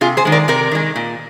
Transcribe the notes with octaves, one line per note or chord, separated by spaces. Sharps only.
C3 F4 G#4
G#4 C5
D#3 G#3
A#4 D5
C3 A#4 D5
D#3 G#3
A#2